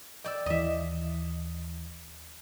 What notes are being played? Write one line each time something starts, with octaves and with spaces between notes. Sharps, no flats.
D5 D#5 G5 E6
D#2 E3 D#5 E5